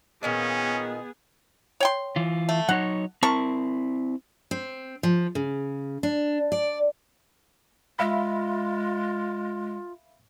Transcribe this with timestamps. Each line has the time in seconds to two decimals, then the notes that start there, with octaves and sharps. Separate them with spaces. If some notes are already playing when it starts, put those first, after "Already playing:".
0.23 A#2 D#3 B3 C#4 G#4 D#5
1.80 C#5 G5 C6
2.16 E3 F4
2.49 A3
2.69 F#3 D#4 C#5 F#5
3.23 C4 E4 A#4 A5 C#6
4.51 C4
5.03 F3
5.35 C#3
6.03 D4
6.52 D5
7.99 G#3 F4 E5 F5 B5